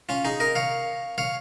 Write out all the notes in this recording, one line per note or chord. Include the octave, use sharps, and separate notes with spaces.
C#4 F4
D#4 G#4
A#4 D#5
C#5 F5
C#5 F5